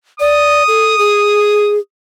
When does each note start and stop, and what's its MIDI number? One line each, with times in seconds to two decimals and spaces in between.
0.20 0.63 74
0.20 1.75 87
0.68 0.98 69
0.98 1.79 68